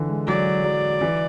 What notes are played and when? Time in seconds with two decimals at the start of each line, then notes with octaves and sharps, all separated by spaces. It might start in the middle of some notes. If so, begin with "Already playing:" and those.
Already playing: D3 E3
0.09 G#3
0.28 F#3 D5
0.64 F#3
1.01 E3